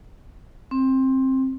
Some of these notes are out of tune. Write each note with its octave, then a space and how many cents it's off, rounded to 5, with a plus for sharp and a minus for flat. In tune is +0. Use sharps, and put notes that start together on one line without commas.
C4 +15